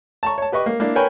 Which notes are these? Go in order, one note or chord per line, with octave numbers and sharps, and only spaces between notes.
A5 A#5 C#6
C#5 A5
G4 B4 D#5 C#6
A#3
A#3 D4 E4
A#4 B4 C#5 G5 G#5 B5